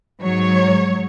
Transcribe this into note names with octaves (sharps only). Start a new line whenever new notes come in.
G#2 F#3 C#5